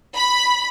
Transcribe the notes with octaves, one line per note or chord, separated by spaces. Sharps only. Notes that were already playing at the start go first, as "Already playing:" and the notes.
B5